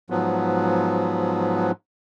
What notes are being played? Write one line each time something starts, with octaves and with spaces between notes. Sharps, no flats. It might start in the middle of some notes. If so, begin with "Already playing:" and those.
G#2 F3 F#3 B3